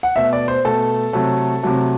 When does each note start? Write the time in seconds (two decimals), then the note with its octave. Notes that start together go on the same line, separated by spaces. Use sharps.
0.03 F#5
0.16 B2 A3 E5
0.33 D5
0.48 C5
0.65 B2 A3 A4
1.13 C3 F#3 A3
1.63 C3 F#3 A3